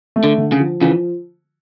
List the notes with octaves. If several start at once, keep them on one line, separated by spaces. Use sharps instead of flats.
A3
D3
D3
C#3
F3
C#3 E3 F3